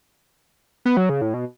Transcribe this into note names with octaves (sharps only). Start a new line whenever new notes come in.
B3
F#3
C#3
A2
B2